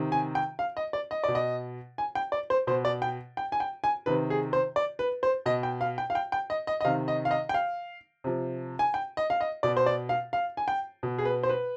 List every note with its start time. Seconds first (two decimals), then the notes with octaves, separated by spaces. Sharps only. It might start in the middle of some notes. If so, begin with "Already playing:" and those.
Already playing: C3 D#3
0.12 G#5
0.35 G5
0.59 F5
0.77 D#5
0.93 D5
1.11 D#5
1.24 B2 D5
1.35 D#5
1.98 G#5
2.15 G5
2.32 D5
2.50 C5
2.67 B2 C5
2.85 D5
3.02 G5
3.37 G5
3.52 G#5
3.60 G5
3.84 G#5
4.06 C3 D#3 B4
4.30 G#4
4.53 C5
4.76 D5
4.99 B4
5.23 C5
5.46 B2 D#5
5.63 G5
5.81 F5
5.98 G5
6.10 F5
6.15 G5
6.32 G5
6.50 D#5
6.67 D#5
6.81 D#5
6.85 C3 D#3 F5
7.08 D#5
7.25 F5
7.31 D#5
7.49 G5
7.54 F5
8.24 C3 F3
8.79 G#5
8.94 G5
9.17 D#5
9.30 F5
9.41 D#5
9.63 B2 D5
9.77 C5
9.86 D5
10.09 F5
10.33 F5
10.57 G#5
10.68 G5
11.03 B2
11.18 G#4
11.25 B4
11.43 C5
11.49 B4